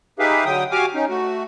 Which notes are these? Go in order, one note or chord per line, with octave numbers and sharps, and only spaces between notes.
D#4 G4 G#4 B4 E5 F5
D3 F#3 G5 D#6
F#4 G4 F5 G#5 D6 F6
C#4 D#4
A3 F#4